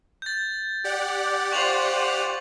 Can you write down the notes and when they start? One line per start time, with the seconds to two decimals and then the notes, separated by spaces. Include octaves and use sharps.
0.22 G6 A6
0.84 G4 D5 F#5
1.52 F4 C5 C#6 F7 F#7